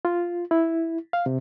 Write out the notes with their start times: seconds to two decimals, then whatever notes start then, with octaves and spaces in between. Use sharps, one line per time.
0.05 F4
0.51 E4
1.13 F5
1.26 C3